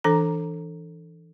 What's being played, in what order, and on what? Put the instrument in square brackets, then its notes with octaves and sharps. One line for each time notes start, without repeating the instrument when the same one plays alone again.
[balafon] E3 D4 A4 A#5